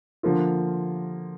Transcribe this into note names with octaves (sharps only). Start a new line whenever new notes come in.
D3 F3 A#3 F4